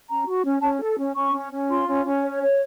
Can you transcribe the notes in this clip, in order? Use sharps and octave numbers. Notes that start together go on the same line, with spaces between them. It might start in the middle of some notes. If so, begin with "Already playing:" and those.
C#4 A#5
F#4
C#4
C#4 A5
A4
C#4
C#4 C#6
C#4
C#4
F4 C6
C#4
C#4
C#5
C#5